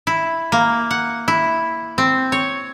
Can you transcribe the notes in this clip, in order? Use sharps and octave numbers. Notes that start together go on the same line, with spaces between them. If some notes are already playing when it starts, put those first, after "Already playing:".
E4
A#3
F#5
E4
C4
C#5